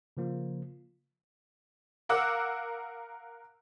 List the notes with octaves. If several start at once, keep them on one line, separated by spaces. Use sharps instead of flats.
C#3 F3 A#3 F4
A#4 F5 F#5 D6 E6 F#6